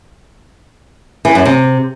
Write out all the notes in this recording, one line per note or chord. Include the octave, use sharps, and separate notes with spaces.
E3
F#2
C3